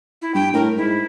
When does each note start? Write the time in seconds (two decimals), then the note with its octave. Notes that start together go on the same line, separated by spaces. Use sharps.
0.22 E4
0.35 G2 G5
0.54 A2 A#4
0.77 G#2 E4